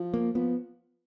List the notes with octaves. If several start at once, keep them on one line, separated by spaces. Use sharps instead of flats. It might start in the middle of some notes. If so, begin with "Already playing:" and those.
Already playing: F3
A#3
F3 B3